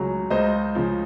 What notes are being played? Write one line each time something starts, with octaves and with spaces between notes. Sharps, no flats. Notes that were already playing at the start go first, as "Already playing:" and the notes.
Already playing: C#2 C#3 F#3
C#2 C5 D#5
C#3 F3